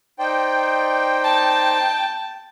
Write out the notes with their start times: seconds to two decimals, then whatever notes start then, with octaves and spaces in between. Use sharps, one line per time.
0.19 D#4 C5 D5 G5
1.24 A5